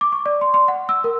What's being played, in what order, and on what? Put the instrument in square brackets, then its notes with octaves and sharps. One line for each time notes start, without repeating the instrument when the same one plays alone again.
[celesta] D6
C#6
D5
C6
C6
F#5
E6
A#4